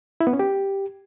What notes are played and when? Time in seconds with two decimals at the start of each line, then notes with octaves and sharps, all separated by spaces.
0.20 E4
0.27 B3
0.33 C#4
0.39 G4